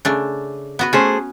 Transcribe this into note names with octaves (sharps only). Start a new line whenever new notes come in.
C#3 A3 D4
B3 F#4 B4
A3 C#4 G#4 C5